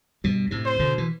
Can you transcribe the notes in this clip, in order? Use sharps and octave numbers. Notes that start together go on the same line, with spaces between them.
G2 B2
A2 C3
C5
B2 D3
E3